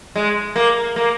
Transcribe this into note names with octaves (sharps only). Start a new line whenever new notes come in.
G#3
A#3
A#3